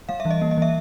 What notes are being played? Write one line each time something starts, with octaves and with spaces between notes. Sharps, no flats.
G3 F5
E5
E3
D#5
A#3
D#5
E3 E5